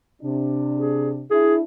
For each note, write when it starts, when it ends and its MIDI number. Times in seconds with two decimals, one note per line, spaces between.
0.22 1.24 48
0.22 1.24 62
0.77 1.10 68
1.31 1.62 62
1.31 1.62 64
1.31 1.55 68